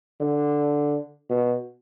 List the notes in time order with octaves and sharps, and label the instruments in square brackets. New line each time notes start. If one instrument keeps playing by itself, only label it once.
[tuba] D3
B2